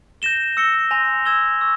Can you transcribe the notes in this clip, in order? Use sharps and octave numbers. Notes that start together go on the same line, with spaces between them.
G6 A#6 E7 G7
E6 A#6 C#7 G7
G#5 C6 G6 A#6 F7
E6 G#6 E7 G7
C#6 E6